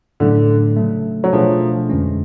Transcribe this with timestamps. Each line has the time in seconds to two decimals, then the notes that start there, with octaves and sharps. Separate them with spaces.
0.20 A2 D3 F#3 A3 D4
0.76 C#3 F#3 A3
1.24 F#3
1.33 B2 F3 A3 D4 G#4 B4
1.90 F2 D3 G#3 C#4